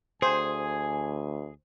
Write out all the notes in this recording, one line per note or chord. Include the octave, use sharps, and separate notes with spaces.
D2 G#4 C5 G#5